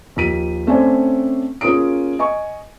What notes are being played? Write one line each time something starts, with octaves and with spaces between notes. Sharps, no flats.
D#2 F3 B6 D#7
A3 C4 C#4 C5 D5 G#5
A#3 C#4 F4 G#4 D#6 D7
D#5 G#5 C#6